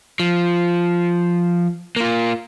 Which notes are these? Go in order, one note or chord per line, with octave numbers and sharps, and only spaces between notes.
F3
A#3 F4